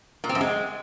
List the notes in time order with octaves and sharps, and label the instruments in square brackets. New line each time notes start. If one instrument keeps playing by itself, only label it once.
[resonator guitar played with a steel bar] A#2
C4
F#2
G#3